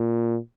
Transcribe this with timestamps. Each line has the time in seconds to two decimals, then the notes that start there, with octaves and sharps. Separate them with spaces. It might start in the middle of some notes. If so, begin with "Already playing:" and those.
Already playing: A#2